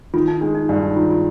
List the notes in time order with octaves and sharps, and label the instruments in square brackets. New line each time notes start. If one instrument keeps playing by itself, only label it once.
[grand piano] D#3 [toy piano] F4
[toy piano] D#4
[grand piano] G#3 [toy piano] D4
[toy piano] D#4
[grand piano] G2 [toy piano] D4
[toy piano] D#4
[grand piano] D#3 [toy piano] F4
[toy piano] F4